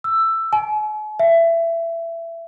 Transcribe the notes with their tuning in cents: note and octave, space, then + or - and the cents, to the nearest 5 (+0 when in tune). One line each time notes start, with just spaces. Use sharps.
E6 +10
G#5 +45
E5 +20